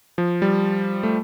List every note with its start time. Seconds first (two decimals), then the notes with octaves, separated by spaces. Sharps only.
0.18 F3
0.42 G3
1.03 A3